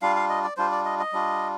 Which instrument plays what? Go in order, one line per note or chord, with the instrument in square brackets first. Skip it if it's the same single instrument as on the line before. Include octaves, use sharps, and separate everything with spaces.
[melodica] G3 D4 F4 F5
F5
D#5
D5
G3 D4 F4 C5
D5
D#5
D#5
G3 D4 F4